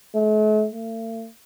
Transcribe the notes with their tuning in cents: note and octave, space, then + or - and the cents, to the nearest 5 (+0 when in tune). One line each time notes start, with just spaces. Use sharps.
A3 -45
A3 +45